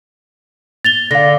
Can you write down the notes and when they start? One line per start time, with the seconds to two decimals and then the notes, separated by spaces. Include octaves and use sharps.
0.85 A6 F7 G7
1.11 D3 F5 A#6